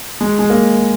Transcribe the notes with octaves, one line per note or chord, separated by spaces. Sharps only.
G#3
G#3
A#3